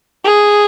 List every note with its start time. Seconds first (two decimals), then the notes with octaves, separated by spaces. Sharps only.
0.24 G#4